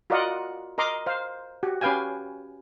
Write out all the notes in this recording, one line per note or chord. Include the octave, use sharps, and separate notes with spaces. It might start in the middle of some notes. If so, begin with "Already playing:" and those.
F4 F#4 A#4 D5 D#5 F#5
A#4 D#5 A#5 C6 D6
C5 F5
F#4 G4
C#4 G4 B4 F5 G5 G#5